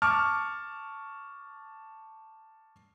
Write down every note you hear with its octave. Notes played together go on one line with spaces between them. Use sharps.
A5 C#6 D6 F6